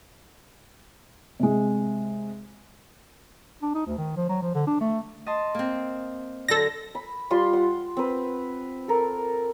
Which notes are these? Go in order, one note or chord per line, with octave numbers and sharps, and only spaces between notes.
C3 G#3
D4
D#4
D2
D#3
F3
F#3
F3
D3
D4
A3
D#5 A5 C6
A#3 C4
D3 F#3 A4 E6 A#6
B5
G3 F4 C6
F#5
C4 B4
A4 A#4